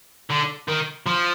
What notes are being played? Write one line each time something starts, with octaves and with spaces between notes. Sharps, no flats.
D3
D#3
F3